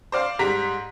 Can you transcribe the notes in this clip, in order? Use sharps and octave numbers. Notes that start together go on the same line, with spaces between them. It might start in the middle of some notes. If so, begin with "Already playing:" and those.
C5 D5 F5
G#2 G3 A#5 B6